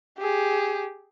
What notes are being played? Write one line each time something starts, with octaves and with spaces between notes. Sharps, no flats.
G4 G#4